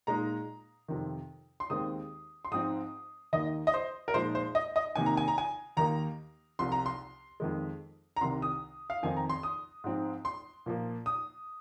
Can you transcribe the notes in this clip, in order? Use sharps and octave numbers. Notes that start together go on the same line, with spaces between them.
A#2 G#3 D#4 A#5
F2 C3 D#3
C6
D#2 D#3 G#3 C4 D#6
C6
G#2 F3 C4 D#4 D#6
D#2 D#3 A#3 D#4 D#5
D#5
C5
A#4
A#2 F3 G#3 D#4 C5
C5
D#5
D#5
C3 D#3 A#3 D#4 G#5
A#5
G#5
A#5
G#5
D#2 D#3 A#3 D#4 A#5
C2 C3 F3 C6
A#5
C6
F2 D#3 G#3
A#5
C2 C3 D#3 C6
D#6
F5
F2 D#3 C4 D#4 G#5
A#5
C6
D#6
G#2 F3 C4 D#4
C6
A#2 F3 A#3
D#6